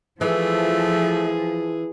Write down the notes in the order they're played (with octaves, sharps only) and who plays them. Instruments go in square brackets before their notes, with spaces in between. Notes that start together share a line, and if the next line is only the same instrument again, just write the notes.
[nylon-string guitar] E3 [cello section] F3 [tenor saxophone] A3 [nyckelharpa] G#4